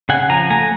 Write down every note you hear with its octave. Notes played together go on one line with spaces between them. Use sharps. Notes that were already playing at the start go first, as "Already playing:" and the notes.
C#3 F#5 G#5
F3 G#5 A#5
A3 G#5 A#5